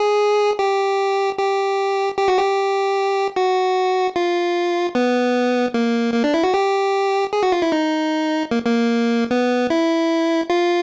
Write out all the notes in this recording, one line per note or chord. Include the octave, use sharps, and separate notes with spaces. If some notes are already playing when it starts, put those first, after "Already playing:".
Already playing: G#4
G4
G4
G4
F#4
G4
F#4
F4
B3
A#3
A#3
D4
E4
F#4
G4
G#4
F#4
F4
E4
D#4
A#3
A#3
B3
E4
F4